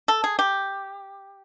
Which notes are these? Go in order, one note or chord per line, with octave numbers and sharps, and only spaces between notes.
A4
G#4
G4